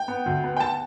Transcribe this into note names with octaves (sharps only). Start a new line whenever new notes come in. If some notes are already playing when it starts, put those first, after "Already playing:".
Already playing: G5
B3
D2
B3
G5
A5